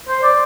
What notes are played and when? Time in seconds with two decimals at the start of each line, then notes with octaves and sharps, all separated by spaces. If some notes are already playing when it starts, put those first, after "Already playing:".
0.09 C5
0.23 D5